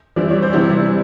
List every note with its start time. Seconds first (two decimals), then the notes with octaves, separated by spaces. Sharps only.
0.16 E3 G3 C4 E4 D5
0.30 C#5
0.42 C5 D5
0.53 C3 E3 G3 C4 E4